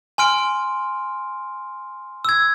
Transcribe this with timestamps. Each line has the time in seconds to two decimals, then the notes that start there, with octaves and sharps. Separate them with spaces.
0.18 G#5 C6 F6 D7
2.25 E6 G#6